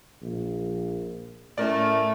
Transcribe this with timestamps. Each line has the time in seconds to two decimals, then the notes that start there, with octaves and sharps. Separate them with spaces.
0.22 A#1
1.58 A2 A3 C#4 A#4 D5